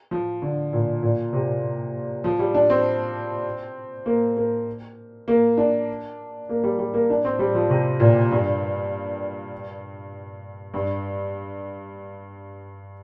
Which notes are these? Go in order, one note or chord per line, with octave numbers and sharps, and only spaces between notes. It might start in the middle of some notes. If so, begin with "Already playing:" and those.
F3
D3
A#2
A#2
C3
F3
G3
D4
C4
A#3
A#3
A#3
D4
A#3
G3
G3
A#3
D4
C4
G3
F3
C3
A#2
G2
G2